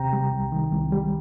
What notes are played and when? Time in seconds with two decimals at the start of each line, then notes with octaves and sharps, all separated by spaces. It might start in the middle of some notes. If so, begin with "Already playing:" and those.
Already playing: D#2 C3 G5 A#5
0.13 G3
0.32 C2
0.52 D#3
0.72 C2
0.92 G3